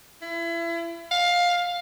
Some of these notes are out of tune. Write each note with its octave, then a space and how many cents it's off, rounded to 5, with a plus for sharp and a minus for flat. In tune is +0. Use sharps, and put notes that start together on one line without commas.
E4 +30
F5 +15